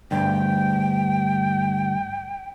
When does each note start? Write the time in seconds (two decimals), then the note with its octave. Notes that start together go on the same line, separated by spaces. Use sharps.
0.11 D2 G2 G5